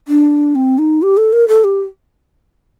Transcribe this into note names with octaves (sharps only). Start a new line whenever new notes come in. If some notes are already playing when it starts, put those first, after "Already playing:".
D4
C4
D#4
G4
A4
A#4
A4
G4